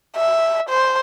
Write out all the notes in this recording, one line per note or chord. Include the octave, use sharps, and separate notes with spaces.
E5
C5